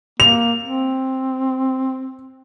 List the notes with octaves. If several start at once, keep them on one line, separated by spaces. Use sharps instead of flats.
A#3 F7
C4